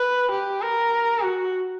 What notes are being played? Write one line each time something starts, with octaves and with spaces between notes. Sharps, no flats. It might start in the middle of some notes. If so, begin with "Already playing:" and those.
Already playing: B4
G4
A#4
F#4